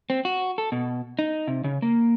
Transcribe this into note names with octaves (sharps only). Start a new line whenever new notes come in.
C4
F#4
A4
B2
D#4
C3
C#3
A#3